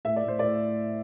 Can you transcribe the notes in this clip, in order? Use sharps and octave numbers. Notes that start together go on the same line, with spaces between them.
A2 E5
D5
A2
C5
A2 D5